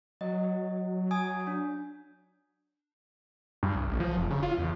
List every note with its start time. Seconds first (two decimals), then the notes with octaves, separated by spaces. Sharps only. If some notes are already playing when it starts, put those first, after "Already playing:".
0.21 F#3 D#5
1.11 G#5 D#6 G#6
1.47 D4
3.63 G2
3.75 C2
3.88 A1
4.00 F3
4.17 F1
4.30 C#3
4.43 F4
4.57 E2